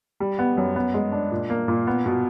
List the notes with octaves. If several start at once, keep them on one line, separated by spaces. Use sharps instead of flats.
G3
B3
F#2
B3
G#3
D4
A#2
A#3
A#2
B3
B2